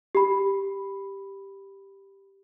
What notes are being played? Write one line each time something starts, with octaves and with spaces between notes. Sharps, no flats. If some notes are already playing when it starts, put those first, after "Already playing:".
G4 B5